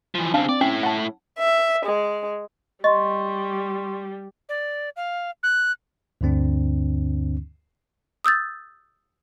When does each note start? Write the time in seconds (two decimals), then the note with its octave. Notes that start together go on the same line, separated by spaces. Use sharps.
0.15 E3 F3
0.34 C#3 C4 D4 F5 A5
0.49 C4 D5
0.61 A2 C#4 E4 G5 C7
0.83 F#5 A5
1.39 E5
1.85 G#3
2.84 G3 D#5 C6 C#6
4.49 D5
4.96 F5
5.43 F#6
6.21 D2 G2 D3 C4 D4
8.24 D#6 E6 G6 A6